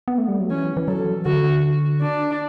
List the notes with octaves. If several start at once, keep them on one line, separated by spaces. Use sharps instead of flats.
B3
A3
G3
F#3
E3 C#4
E3
F#3 A4
D3 F#4
D4